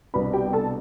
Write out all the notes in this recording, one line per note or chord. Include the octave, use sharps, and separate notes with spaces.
C2 B2 B3 D4 B4 B5
G4 G5
A4 A5